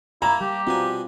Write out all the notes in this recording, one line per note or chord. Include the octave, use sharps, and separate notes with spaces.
A#3 E4 A5 A#5
G3 G4
B2 C4 D4 F4 G#5